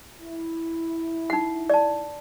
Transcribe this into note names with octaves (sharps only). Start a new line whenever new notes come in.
E4
D#4 F#5
D5 A5